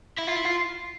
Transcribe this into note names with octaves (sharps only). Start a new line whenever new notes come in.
E4
F4
E4
F4